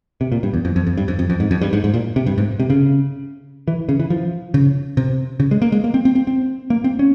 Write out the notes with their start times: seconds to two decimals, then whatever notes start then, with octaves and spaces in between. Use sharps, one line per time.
0.21 C3
0.32 A#2
0.43 G2
0.54 E2
0.65 F2
0.76 F2
0.87 F2
0.97 G2
1.08 F2
1.19 F2
1.30 F2
1.40 G#2
1.51 F2
1.61 G2
1.73 G#2
1.84 G#2
1.94 A#2
2.16 C3
2.26 G2
2.38 G#2
2.60 C3
2.70 C#3
3.68 E3
3.89 C#3
4.00 E3
4.10 F3
4.54 C#3
4.97 C3
5.40 C#3
5.51 G#3
5.62 A#3
5.72 G#3
5.84 A#3
5.94 C4
6.05 C4
6.15 C4
6.27 C4
6.70 A#3
6.84 C4
6.99 C#4